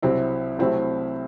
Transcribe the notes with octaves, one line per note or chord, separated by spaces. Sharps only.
C2 C3 F#3 C4 E4
C2 C3 F#3 A3 C4 E4